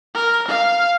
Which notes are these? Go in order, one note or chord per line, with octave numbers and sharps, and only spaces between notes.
A#4
F5